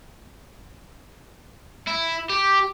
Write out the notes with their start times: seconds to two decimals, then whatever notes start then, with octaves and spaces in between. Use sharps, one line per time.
1.87 E4
2.29 G4